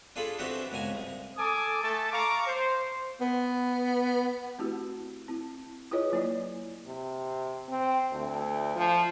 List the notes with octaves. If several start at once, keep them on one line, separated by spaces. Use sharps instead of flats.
D4 F4 G#4 A4 A5 B5
E3 C4 D4 F#4 G4
C#2 B2 A#4 G#5
C2
A4 G#5 D6 D#6
A3 A4 A5
F5 A#5 C#6 D6
C5
B3
A3 C4 E4 F#4 G4
C4 E4
E4 F4 G#4 B4 C#5 D#5
F#3 A#3 E4 C#5 D5
C3
C4
D2
F3